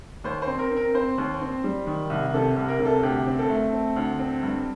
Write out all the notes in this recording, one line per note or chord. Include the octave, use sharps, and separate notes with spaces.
D#2 C5
C5
C4
A#4
C4
A#4
C4 C5
D#2
C4
G3
D#3
C2
C3 A4
C2
A#4
C3
A4
D2 G4
C4
A4
A3
C4
D2
C4
G2